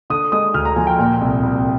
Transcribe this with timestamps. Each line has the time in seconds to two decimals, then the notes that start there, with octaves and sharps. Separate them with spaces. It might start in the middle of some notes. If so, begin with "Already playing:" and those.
0.10 D3 D#6
0.32 G#3 D#6
0.54 D2 F6
0.65 A#5
0.76 F3 G#5
0.87 G5
0.99 A#2
1.21 C2
1.43 C2